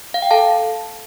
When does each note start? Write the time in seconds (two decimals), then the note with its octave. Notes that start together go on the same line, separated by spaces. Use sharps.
0.14 F5
0.22 G5
0.31 A4 F5 A5